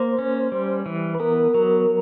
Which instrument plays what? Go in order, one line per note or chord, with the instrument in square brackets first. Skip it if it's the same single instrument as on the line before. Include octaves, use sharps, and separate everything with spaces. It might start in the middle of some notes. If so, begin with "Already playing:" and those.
Already playing: [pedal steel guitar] A#3 [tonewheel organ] C5
[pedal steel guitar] C#4
G3
E3
[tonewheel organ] B4
[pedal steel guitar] B3 [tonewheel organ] A#4
[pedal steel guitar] F#3